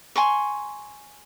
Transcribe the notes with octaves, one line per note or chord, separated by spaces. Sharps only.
G#5 C6 C#6